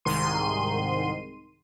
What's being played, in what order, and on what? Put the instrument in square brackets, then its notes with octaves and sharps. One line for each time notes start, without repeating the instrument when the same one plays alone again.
[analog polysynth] C2 G#2 D#3 C6 D#7